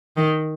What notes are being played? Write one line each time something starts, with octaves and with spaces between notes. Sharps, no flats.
D#3